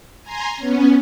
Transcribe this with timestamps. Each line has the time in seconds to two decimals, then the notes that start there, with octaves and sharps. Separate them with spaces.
0.22 G#5 A#5 C6
0.57 B3 C#4